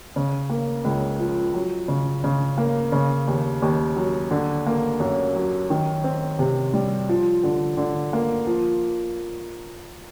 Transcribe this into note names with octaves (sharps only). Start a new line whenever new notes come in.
C#3
A#3
C#2
F3
F#3
C#3
C#3
A#3
C#3
D#2
D#2
F#3
D3
A#3
F#2
F#3
D#3
C4
C3
G3
F3
D3
D3
A#3
F3